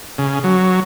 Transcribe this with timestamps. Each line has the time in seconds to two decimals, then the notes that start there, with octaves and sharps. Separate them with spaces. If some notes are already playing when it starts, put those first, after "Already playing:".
0.18 C#3
0.44 F#3